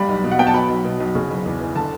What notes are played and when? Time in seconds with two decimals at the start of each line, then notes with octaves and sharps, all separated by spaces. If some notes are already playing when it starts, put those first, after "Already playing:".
Already playing: G1 G3 B5
0.09 B1
0.24 B2
0.32 F#5
0.39 B3 G5
0.47 A5
0.54 F#3 B5
0.69 B1
0.84 B2
1.00 B1
1.15 C#3
1.30 F#1
1.45 E2
1.60 E3
1.75 D3 A5